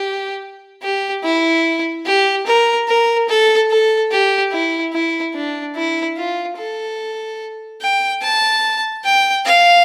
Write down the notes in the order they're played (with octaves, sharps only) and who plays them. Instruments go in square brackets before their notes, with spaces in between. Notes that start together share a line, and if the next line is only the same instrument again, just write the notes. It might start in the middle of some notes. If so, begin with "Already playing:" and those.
Already playing: [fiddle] G4
G4
E4
G4
A#4
A#4
A4
A4
G4
E4
E4
D4
E4
F4
A4
G5
A5
G5
F5